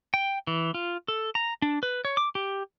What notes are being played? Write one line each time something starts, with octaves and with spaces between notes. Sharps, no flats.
G5
E3
F4
A4
A#5
D4
B4
C#5
D6
G4